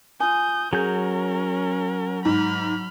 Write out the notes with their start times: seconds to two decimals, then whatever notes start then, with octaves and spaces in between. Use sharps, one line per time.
0.20 F4 G#5 D#6 G6
0.73 F#3 C#4 G#4 A#4 G6
2.25 G#2 B5 F6